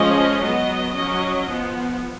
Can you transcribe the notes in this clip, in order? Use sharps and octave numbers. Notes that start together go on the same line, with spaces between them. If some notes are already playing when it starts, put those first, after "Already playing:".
Already playing: F3 G#3 C#4 D#5
F#3 B3 D#5
F#3 C#4 D#5
F3 B3